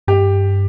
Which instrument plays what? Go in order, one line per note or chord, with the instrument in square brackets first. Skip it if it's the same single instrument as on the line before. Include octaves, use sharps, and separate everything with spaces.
[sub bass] G2 [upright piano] G4